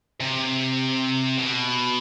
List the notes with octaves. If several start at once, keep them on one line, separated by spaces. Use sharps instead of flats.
C3
B2